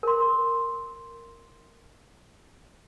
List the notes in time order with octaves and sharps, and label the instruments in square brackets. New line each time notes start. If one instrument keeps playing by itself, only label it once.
[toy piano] A#4 C6